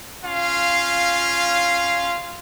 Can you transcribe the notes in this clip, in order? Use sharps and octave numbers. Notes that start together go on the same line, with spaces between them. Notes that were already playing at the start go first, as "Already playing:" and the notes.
C#4 F4 F5